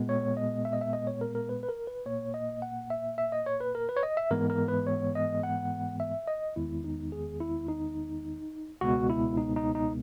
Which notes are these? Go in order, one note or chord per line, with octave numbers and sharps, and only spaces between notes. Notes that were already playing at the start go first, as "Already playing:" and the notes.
Already playing: A#2 G#3 B3
C#5
D#5
E5
D#5
E5
D#5
C#5
A#4
A#4
B4
B4
A#4
B4
A#2 A#3 C#5
D#5
F#5
E5
E5
D#5
C#5
B4
A#4
B4
C#5
D#5
E5
G#2 E3 G#3 B3 A#4
A#4
B4
C#5
D#5
F#5
E5
D#5
E2 D#3 G#3 B3 E4
D#4
G#4
E4
D#4
C#2 B2 G#3 B3 F#4
E4
D#4
D#4
D#4